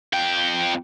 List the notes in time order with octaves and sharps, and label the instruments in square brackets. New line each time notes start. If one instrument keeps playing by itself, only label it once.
[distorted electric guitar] F2 G5